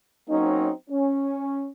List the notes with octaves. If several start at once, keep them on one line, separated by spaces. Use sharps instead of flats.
F#3 A#3 C4 C#4 D#4
C#4